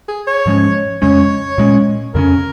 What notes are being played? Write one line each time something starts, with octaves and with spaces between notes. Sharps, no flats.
G#4
C#5
G#2 F3 G#3 C#4
F2 C#3 G#3 C#4 C#5
A#2 G#3 C#4
F2 C#3 A#3 C#4 A#4